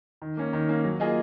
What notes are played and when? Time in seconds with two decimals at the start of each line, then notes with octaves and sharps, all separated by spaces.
0.22 D#3
0.37 A#3 C#4
0.53 D#3
0.69 A#3 C#4
0.85 F#3
1.00 A#3 F4 G#4 D#5